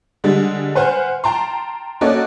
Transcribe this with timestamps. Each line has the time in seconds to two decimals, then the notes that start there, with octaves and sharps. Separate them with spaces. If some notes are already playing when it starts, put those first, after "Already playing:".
0.24 D3 G3 G#3
0.75 B4 C5 F#5 G#5 F6
1.24 G5 A5 A#5 C6
2.01 A#3 C#4 F#4 A4 D5 D#5